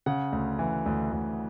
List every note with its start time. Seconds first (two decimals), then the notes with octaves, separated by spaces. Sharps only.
0.06 C#3 F#5
0.32 D2
0.59 E3
0.86 D2
1.12 D2